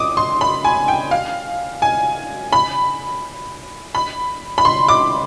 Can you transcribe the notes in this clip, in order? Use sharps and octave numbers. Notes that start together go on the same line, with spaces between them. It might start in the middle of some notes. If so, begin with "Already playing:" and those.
Already playing: D6 D#6
C6
B5
G#5
G5
F5
G#5
B5
B5
B5
C6
D6